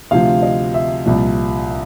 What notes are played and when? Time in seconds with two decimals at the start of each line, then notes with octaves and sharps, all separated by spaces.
0.11 D2 C3 F3 F5
0.43 D#5
0.74 E5
1.06 C2 A#2 F3